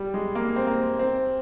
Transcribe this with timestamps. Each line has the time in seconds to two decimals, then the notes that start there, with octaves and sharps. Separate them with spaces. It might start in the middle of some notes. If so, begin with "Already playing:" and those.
Already playing: G3
0.14 G#3
0.35 A#3
0.56 C4
0.67 A#3
0.99 C4